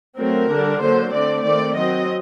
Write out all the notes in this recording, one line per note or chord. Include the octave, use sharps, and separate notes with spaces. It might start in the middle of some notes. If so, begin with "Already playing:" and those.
F#3 A3 C4 A#4
D3 G3 D4
D3 F#3 A#3 C5
D3 A3 C4 D5
D#3 A3 C4 D5
F#3 C4 D#5